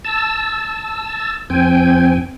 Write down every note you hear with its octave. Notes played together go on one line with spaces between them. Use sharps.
A5 E6
F2 C4 G5 G#5